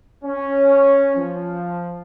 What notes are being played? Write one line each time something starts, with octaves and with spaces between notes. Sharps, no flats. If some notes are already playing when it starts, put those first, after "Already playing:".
C#4
F3